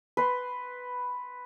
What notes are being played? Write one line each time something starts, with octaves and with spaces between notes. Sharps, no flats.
B4 C6